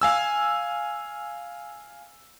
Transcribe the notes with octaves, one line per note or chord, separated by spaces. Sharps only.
F5 G#5 E6